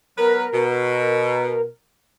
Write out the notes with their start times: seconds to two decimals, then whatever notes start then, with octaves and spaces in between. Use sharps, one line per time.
0.18 F#3 B3 A#4 B4
0.54 B2